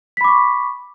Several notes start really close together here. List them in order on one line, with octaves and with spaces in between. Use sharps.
B6 B5 D6 C#6